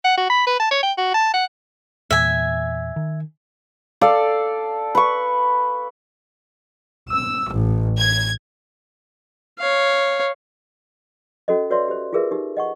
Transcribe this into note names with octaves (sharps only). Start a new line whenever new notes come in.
F#5
F#4
B5
B4
A5
C#5
G5
F#4
A5
F#5
E2 A#2 E5 G#5
D#3
A4 D5 F5
B4 C#6
E6
A1
G#6
C#5 F5
C#4 F#4 A4 C5 D#5
F#4 B4 C#5 D5 E5 C6
G4 C5
F4 G4 G#4 A#4 B4 E5
D#4 G4
D#5 F#5 C#6